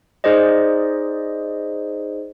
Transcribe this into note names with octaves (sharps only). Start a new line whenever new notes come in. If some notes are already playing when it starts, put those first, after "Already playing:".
D#4 G#4 C5 D5 D#5